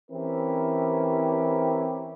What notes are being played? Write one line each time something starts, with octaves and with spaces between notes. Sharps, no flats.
E3 C4 C#4 E4 G4 A#4